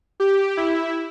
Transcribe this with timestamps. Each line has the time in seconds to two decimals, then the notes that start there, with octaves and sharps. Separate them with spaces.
0.20 G4
0.57 E4